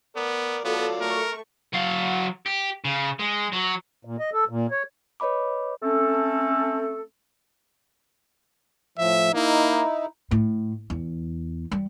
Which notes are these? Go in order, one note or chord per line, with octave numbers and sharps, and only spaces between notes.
B3 A#4 D5
F#3 B3 F4 A4 D5
A3 A#4 C#6
F#3 F5
G4
C#3
G#3
F#3
A#2
D#5
A4
A#2
C#5
B4 C#5 D#5 B5 D6
A3 C4 C#4 A4
A2 F3 E5
A#3 D#4 E4
A2
E2
G3